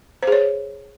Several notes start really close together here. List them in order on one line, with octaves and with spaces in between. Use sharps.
C5 G#4 C#5